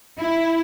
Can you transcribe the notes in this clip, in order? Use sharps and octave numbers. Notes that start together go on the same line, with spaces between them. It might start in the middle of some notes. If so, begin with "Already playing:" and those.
E4